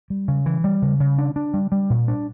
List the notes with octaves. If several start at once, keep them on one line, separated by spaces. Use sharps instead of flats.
G3
C#3
E3
G3
C#3
C#3
D4
D4
G3
G3
A#2
D4